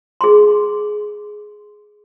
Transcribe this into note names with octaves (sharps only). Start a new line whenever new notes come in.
G#4 C6